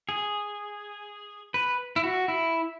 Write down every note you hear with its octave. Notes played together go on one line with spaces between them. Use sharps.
G#4
B4
E4
F#4
E4